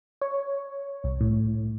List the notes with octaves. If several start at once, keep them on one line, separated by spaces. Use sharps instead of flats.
C#5
C2
A2